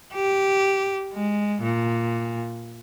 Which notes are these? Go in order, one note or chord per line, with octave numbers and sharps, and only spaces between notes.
G4
G#3
A#2